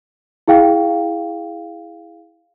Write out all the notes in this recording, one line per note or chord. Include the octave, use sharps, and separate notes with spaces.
E4 G#4 F5 G5